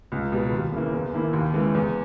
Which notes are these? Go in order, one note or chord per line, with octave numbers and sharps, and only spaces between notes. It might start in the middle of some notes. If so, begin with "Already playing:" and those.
C#2
B2 G3
D#2
C#3 E3 A#3
E2
D#3 A#3 E4
D#2
C#3 E3 G#3
E2